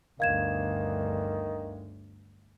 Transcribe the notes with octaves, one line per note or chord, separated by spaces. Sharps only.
G1 D2 D#3 F5 G#6 E7